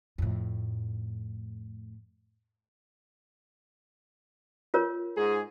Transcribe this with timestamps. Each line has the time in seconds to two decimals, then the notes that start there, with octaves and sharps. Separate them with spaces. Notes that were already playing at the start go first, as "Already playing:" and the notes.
0.18 F2 A2
4.74 F4 A#4 C#5
5.16 G#2 G#4